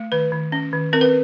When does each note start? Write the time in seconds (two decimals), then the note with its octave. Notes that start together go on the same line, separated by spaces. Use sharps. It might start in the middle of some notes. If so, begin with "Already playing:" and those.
Already playing: A3
0.12 D#3 B4
0.32 D#3
0.52 C#4
0.73 D#3
0.93 C4 A#4
1.01 B4